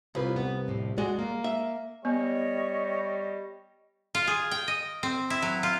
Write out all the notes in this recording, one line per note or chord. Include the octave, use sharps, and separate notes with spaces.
C2 E4 F4 B4
B3
F2 A2 C3
G#3 F#4 D5
A#3
E5
G3 B3 C#5 D#5
F4
G#4
G5
D#5
C4
E4
F#3
F4